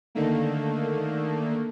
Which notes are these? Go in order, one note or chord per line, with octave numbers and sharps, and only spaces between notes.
D3 D#3 A3 A#3